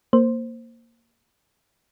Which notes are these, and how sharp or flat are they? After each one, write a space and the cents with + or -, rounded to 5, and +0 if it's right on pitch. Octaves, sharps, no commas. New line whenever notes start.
A#3 -10 C5 +0